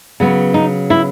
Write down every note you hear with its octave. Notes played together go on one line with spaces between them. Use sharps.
C#3 F#3 B3
D#4
E4